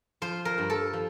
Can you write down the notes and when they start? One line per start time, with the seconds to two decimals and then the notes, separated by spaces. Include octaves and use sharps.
0.22 F3 C5
0.45 A#4
0.58 G2
0.70 A4
0.93 F3